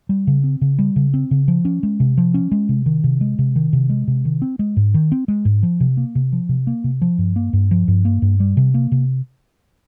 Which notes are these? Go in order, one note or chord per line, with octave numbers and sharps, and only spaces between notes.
G3
C#3
C4
C#3
G3
C#3
C4
C#3
F3
C#4
G#3
C3
F3
C#4
G#3
C3
D#3
C3
G#3
C3
D#3
C3
G#3
C3
D#3
C4
G#3
G#2
D#3
C4
G#3
G#2
F3
C3
A#3
C3
F3
C3
A#3
C3
F3
G2
A#3
G2
F3
G2
A#3
G2
G3
C3
A#3
C3